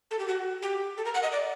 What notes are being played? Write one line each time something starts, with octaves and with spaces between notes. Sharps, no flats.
A4
G4
F#4
G4
A4
A#4
F#5
D#5
D5